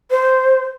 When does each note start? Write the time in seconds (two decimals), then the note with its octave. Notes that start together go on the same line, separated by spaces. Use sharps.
0.11 C5